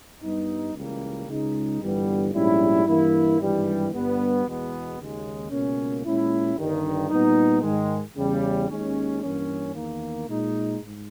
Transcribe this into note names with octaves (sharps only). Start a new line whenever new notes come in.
G2 G3 B3 D#4
C#2 C#3 E3 G3 A#3
C#2 C#3 G#3 D#4
G1 G2 E3 G3 B3
A#1 G#2 G3 C#4 E4
G2 E3 A#3 E4
G#1 G2 E3 G3
G1 G2 G3 B3
E2 B2 G#3 B3
D#2 C#3 G#3
C#2 B2 A#3 C#4
A#2 G#3 C#4 E4
G1 G2 D#3
A#2 G3 B3 D#4
G#2 D#3 G#3
E2 C#3 G3
D#2 D#3 G#3 C#4
G2 E3 A#3 C#4
E2 D#3 A#3
A#2 G#3 D#4
G#2